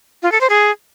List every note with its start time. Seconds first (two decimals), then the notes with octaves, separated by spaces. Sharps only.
0.23 F4
0.32 A4
0.41 C5
0.50 G#4